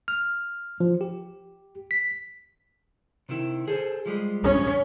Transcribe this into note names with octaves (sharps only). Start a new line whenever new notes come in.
F6
F3
G4
B6
C3 D#3 E4
G#4 A4 C5
F3 G3 G#3
C#4